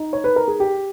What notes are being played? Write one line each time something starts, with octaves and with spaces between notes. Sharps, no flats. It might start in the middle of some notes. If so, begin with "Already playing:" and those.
Already playing: D#4
C#5
B4
A#4
G#4
G4